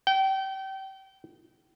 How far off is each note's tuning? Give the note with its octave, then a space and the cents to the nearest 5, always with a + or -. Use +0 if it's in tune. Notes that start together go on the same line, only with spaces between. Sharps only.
G5 -30